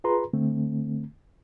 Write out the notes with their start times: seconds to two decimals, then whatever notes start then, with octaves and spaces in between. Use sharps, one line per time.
0.04 F4 G#4 B4 A#5 C6
0.33 D3 A3 C4